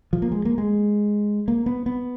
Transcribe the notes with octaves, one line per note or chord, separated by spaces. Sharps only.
F3
A#3
G#3
A#3
G#3
A#3
B3
B3